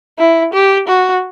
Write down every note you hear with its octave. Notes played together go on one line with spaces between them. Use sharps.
E4
G4
F#4